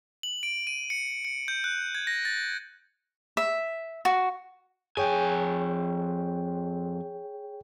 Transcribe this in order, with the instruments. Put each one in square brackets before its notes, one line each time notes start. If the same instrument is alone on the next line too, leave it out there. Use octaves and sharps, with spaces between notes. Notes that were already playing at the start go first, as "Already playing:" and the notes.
[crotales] F#7
D7
D#7
C#7
C#7
G6
F#6
G#6
A#6
A6
[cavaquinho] E5
F#4
[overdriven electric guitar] F2 G#5 [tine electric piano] G#4 C#5 G5